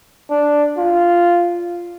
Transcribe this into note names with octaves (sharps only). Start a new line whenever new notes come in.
D4
F4